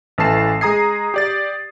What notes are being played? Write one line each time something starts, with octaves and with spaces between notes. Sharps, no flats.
A1 E3 A3 A5 C7 E7
G#3 G#4 A#5 D#6 G#6 C7
G4 D5 A6